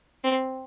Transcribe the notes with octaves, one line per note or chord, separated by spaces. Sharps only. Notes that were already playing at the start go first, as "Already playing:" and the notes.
C4